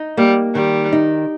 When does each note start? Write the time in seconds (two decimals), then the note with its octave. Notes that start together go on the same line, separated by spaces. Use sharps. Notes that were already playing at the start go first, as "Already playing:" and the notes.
Already playing: D#4
0.17 G3 A#3
0.55 D#3 G3
0.93 D#4